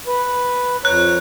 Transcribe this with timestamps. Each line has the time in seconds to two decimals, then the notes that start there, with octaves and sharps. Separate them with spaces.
0.07 B4
0.85 F2 C#5 A#5 F#6